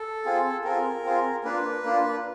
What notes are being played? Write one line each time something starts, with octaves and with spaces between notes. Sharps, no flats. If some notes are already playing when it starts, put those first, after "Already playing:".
Already playing: A4
C4 F4 G#4
C4 F4 G#4 A#4
C4 F4 G#4
A#3 D4 F4 B4
A#3 D4 F4